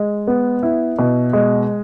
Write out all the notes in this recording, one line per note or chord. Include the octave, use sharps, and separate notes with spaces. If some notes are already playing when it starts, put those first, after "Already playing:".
Already playing: G#3
B3
E4
B2
G#3